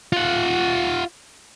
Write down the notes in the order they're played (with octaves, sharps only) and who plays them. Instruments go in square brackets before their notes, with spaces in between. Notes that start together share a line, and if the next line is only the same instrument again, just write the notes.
[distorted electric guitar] F4 F#5